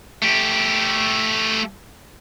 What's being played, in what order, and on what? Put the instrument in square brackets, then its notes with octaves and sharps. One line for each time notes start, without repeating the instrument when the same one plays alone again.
[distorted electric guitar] A3 G4